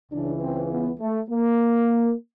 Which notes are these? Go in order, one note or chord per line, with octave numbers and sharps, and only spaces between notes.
C#2 C#3 E3 D4
C4
B3
A3
A#3